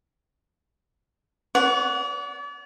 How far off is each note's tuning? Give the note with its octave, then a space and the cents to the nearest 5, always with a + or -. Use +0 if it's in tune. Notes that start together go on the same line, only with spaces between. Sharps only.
D5 -40 F#5 +0 C#6 +25